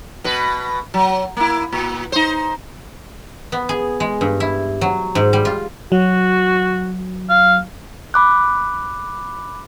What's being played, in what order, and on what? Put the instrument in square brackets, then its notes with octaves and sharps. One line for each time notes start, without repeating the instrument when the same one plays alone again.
[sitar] B2 B4
F#3
A#3 E4
A#2
D#4 C5
[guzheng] B3
G#4
G#3
G2
E4
F#3
G#2
G3
F4
[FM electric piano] F#3 [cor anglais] F#4
[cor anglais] F5
[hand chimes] B5 D6 F#6